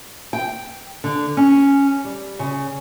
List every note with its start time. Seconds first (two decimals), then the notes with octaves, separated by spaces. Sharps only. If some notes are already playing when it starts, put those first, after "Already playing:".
0.33 G5
1.04 D3
1.37 C#4
2.05 G3
2.39 C#3